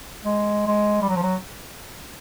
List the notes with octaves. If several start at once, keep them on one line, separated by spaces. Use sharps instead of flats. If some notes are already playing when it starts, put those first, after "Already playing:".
G#3
G#3
G3
F#3
F3
F#3